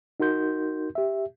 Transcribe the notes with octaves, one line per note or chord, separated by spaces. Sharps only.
D#4 F#4 A#4 C6 G6
G4 E5